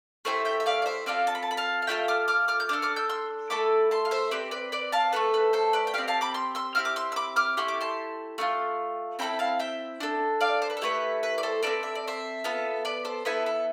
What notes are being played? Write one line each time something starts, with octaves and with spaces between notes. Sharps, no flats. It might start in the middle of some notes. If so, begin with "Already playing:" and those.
A3 E4 G4 C5 E5
E5 G5
E5
D5 F5
D5
C5 E5
C4 F4 A4 D5 F5
A5
B5
A5
B5
F5 A5
F5
A3 D4 F4 A4 E5 G5
D6 F6
D6 F6
D6 F6
G6
D4 A4 D6 F6
D6 F6
E6 G6
C6 E6
A3 E4 A4 B5 D6
A5 C6
F5
C5 E5
C4 G4 B4 D5
B4 D5
B4 D5
F5 A5
A3 D4 A4 B4
B4
A4 C5
B4 D5
G5
C4 G4 D5 F5
F5 A5
B5 D6
C6 E6
C6 E6
C4 E4 G4 F6
D6
C6 E6
E6
B5 D6
D6 F6
A3 E4 G4 C6
D6
A5 C6
A3 D4 F4
C4 E4 A4 G5 B5
F5 A5
E5 G5
D4 A4
D5 F5
C5
B4
A4
A3 E4 G4 B4
B4
D5
A4 C5
C4 E4 A4 B4 D5
E5
D5
C5 E5
B3 F4 A4
B4 D5
A4 C5
B3 E4 A4 B4
A4